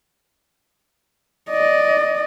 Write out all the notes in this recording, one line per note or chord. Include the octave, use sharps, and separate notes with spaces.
D5 D#5